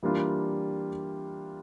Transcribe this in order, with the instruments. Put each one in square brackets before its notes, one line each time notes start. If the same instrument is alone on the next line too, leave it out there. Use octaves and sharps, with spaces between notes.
[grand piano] E3 G3 A#3 D4 F4